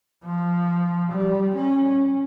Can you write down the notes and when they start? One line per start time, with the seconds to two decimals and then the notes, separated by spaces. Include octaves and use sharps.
0.25 F3
1.12 G3
1.56 C#4